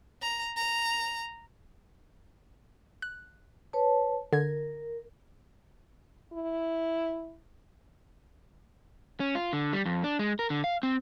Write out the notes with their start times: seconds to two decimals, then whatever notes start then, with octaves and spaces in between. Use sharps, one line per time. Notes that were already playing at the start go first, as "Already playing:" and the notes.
0.22 A#5
0.56 A#5
3.02 F#6
3.73 B4 C#5 A5
4.33 D3 A#4 G#6
6.33 E4
9.20 C#4
9.35 F4
9.53 D3
9.73 G3
9.86 F2
10.04 D4
10.19 G#3
10.39 A#4
10.50 D3
10.64 F5
10.83 C4